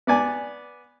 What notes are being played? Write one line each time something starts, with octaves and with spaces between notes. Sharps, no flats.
B3 D5 G#5